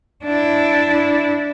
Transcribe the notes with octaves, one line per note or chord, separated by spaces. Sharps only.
D4 E4